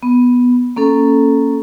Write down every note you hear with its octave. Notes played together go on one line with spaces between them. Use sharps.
B3
A#3 C#4 A4